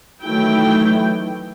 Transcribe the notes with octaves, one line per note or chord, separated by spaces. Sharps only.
D#3 E3 F#3 A3 E4 G5